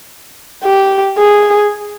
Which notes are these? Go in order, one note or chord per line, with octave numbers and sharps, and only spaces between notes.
G4
G#4